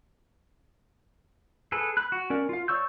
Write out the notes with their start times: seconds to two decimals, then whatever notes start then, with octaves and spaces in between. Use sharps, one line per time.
1.72 G#4 A4 B4
1.97 B5 F#6
2.12 F#4
2.30 C#4 A#4 D5
2.49 F4 F5
2.68 C#5 D5 C#6 E6 G6